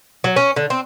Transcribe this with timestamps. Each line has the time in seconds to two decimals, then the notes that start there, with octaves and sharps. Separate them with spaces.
0.24 F#3
0.36 C#4
0.56 D3
0.70 C4